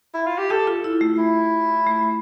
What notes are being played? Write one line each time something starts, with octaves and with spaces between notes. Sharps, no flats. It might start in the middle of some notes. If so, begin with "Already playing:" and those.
E4
F4
G4
G4 A4
F4
E4
A3
E4
A3